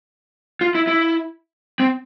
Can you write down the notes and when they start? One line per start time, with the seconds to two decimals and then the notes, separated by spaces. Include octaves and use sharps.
0.61 F4
0.75 E4
0.87 E4
1.80 C4